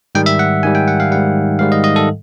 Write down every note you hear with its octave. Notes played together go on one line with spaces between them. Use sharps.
G#2 D#3 G3 G5
E5
F#5
G#2 D#3 G3 G#5
G5
F#5
F5
G#2 D#3 G3 F#5
G#2 D#3 G3 F5
D#5
D#5
A4